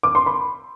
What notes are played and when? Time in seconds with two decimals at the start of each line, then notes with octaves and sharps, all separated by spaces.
0.03 D6
0.15 C6
0.26 B5